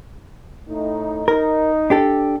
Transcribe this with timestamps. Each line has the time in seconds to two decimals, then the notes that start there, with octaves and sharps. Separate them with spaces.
0.69 A2 D#4
1.28 D#4 A#4
1.90 D4 G4 A4